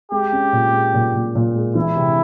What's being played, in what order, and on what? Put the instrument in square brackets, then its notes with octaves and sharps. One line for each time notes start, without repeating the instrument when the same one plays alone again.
[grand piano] G#3 [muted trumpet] G4
[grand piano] C#4
A#2
G#3
A#2
A#2
A#2
G#3
[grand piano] E3 [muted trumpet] E4
[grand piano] C3